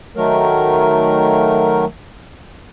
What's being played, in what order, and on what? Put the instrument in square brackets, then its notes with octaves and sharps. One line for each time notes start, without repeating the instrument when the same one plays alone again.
[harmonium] D#3 F#3 A3 A#4